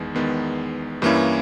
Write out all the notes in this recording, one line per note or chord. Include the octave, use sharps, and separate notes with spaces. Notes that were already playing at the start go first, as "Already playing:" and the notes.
Already playing: E2 D#3 G#3 B3
E2 D#3 G#3 B3
G2 E3 A#3 C#4 E4